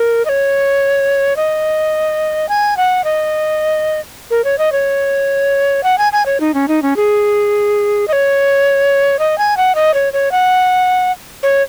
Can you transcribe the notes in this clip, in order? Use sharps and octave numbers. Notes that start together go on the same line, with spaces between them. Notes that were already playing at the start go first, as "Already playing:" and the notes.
Already playing: A#4
D#5
C#5
D#5
G#5
F#5
D#5
A#4
C#5
D#5
C#5
F#5
G#5
G#5
C#5
D#4
C#4
D#4
C#4
G#4
D#5
C#5
D#5
G#5
F#5
D#5
C#5
C#5
F#5
C#5